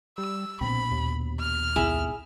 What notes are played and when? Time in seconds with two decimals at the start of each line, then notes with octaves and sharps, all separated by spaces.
0.18 G3 E6
0.61 A#1 B2 C4 B5
0.91 D#2
1.40 F6
1.76 B1 G#2 E4 G#4